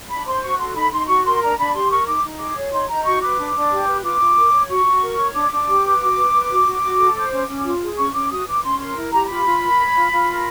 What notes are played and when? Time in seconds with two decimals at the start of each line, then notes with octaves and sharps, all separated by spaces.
0.09 D4 B5
0.25 C5 C6
0.42 F#4 C#6
0.58 A4 C6
0.75 D#4 B5
0.91 D#4 C6
1.08 F#4 C#6
1.24 A#4 C6
1.41 D4 A#5
1.57 D4 B5
1.73 G4 C6
1.89 A#4 C#6
2.06 D#4 D6
2.22 D#4
2.39 G#4 D6
2.55 C#5
2.72 D#4 C6
2.88 D#4 A#5
3.05 F#4 C#6
3.21 B4 D6
3.37 D4
3.54 D4
3.71 G4
3.87 B4
4.03 F4 D6
4.20 F4
4.36 A#4
4.53 C#5
4.68 F#4 C#6
4.85 F#4
5.01 A#4
5.18 C#5
5.34 D4 D6
5.51 D4
5.68 G4
5.83 B4
6.00 F#4
6.17 B4
6.33 B4
6.50 F#4
6.66 F#4
6.82 F#4
6.98 A4
7.15 C5
7.31 C#4
7.48 C#4
7.64 F4
7.81 G#4
7.97 C#4 C#6
8.13 C#4 D6
8.30 F#4 D#6
8.46 B4 D6
8.62 C#4 C6
8.79 A#4 C6
8.96 E4
9.11 G4 A#5
9.28 F4 B5
9.44 F4
9.61 A#4
9.77 C#5
9.94 F4
10.11 F4
10.27 A#4